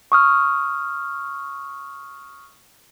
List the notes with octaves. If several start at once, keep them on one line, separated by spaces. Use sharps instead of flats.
C#6 D#6 F6